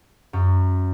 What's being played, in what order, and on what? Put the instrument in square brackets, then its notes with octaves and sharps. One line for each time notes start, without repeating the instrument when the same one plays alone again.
[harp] F#2